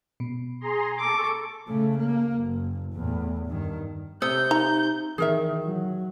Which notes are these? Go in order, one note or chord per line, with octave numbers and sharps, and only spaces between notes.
B2
G#4 A#5 C6
A4 C#6 D6
C#3 A3
A#3
F#1
E2 A2
G2 D#3
C3 D#6 E6 G6 C#7
D#4 A#5
D#3 E3 G#4 A#4 E5
F#3